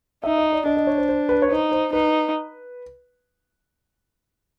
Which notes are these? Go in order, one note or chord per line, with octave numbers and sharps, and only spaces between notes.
D#4 E5
D#5
D5
D4 D#5
D#5
C#5
C5
C5
B4
C#5
D#4 C5
C5
D#4 B4